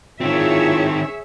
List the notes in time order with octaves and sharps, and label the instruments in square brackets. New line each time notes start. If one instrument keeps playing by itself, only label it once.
[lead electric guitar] D#3 C4 [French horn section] E4 F4 [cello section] G#4 C#5 E5